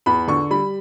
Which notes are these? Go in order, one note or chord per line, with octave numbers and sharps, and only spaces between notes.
E2 B5
D3 C#6
G3 B5